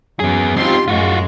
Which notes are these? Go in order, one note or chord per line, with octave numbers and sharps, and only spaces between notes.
F#2 B3 G#4
C4 D#4 F4 G4 C6
F#2 A2 G#3 F4 F#4